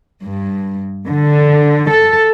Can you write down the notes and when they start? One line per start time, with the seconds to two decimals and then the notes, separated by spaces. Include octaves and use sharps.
0.23 G2
1.07 D3
1.90 A4